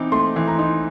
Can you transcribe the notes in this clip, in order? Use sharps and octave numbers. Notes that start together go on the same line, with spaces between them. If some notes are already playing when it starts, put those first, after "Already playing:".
Already playing: E3 C4 D#4 D6
A3 C6
E3
A#5
D#4